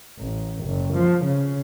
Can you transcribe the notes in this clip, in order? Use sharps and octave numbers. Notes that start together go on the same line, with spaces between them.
A1
F#1
F3
C#3